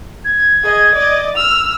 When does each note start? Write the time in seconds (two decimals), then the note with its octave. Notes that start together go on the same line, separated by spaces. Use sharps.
0.25 G#6
0.63 G#4 D#5
0.95 D5 D#5
1.36 E6 F6 F7